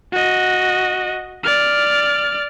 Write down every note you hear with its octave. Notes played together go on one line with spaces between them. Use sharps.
F#4 D#5
D5 F6